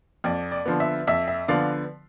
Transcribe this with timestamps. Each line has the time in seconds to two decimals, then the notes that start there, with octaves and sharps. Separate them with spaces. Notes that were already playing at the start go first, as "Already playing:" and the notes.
0.24 F2 D5
0.51 D5
0.66 D3 F3 B3
0.80 E5
1.07 F2 E5
1.28 E5
1.48 D3 F3 B3 D5 F5